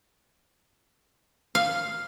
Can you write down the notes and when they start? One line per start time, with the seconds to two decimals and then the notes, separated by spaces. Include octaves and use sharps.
1.55 F5